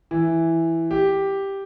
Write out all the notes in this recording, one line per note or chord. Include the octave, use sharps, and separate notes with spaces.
E3
G4